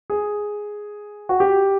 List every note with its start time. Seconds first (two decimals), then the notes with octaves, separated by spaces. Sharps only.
0.10 G#4
1.29 F#4
1.40 G4